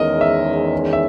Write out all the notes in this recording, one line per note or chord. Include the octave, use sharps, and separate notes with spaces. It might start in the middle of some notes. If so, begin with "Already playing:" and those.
Already playing: E2 D#3 G#3 C#4 A#4 D#5
E5
E5